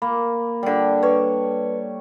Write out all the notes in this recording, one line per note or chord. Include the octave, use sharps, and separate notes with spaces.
A#3 B5
D3 G3
B4 C#5